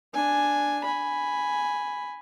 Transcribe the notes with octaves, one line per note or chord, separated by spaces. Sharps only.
D4 G#5
G#5 B5